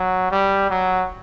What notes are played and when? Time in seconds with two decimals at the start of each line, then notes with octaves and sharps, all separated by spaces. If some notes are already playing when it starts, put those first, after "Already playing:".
Already playing: F#3
0.31 G3
0.70 F#3